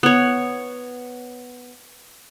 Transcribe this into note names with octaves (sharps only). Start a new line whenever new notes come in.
B3 C#5